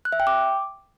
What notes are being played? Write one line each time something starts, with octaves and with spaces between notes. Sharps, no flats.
F#6
E5
G5
D6